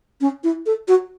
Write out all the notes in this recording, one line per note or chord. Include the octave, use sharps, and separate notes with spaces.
C#4
E4
A4
F#4